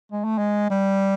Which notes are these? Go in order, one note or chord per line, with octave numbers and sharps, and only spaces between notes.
G#3
A3
G#3
G3